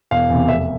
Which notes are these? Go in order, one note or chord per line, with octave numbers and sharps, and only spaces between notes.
E1 F5
E2 C3
F1 E5